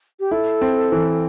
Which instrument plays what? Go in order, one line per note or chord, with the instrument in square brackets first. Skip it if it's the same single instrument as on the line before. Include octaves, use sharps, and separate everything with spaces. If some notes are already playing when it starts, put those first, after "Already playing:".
[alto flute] G4
[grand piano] E4 [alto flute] A4
[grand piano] C4
E3